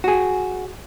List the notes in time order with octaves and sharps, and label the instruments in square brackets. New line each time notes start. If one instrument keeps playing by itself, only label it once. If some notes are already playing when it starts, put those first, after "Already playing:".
[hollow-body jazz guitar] F#4 G#4